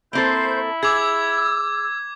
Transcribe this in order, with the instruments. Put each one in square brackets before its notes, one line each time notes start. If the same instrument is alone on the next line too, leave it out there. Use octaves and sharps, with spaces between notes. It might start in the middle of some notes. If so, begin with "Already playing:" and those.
[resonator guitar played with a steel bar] A#3 C4 A4 [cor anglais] E4 [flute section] C5 G6
[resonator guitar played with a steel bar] G#4 [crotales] D6 G#6 [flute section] E6